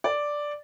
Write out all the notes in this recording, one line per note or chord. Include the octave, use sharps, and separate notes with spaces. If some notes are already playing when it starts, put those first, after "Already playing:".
D5